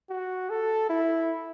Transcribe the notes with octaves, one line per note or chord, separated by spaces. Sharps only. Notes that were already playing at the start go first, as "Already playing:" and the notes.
F#4
A4
E4